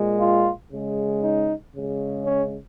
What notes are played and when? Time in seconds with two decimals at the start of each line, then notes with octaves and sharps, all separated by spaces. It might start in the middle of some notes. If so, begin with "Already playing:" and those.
Already playing: A#2 G#3
0.20 F4
0.70 C#3 G#3
1.22 D#4
1.74 C#3 G#3
2.26 C#4